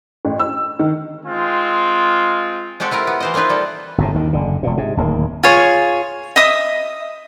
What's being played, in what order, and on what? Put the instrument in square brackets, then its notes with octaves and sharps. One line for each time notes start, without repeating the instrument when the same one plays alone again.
[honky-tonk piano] A1
E6
D#3
[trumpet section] G#3 C4 F4
[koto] G#3 C4 F#4 G4 A4
C4 E4 F4 A#4
B3
E3 C5 D#5
A#3 C4 D#4 F4 B4
G3 A4
[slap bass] G1 A2 C3
D#2 D#3
F#1 D3
E1 A#2
G#2 C3
D1 D#2 F3 A#3
[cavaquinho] F4 G#4 C#5
D#5 E5 D#6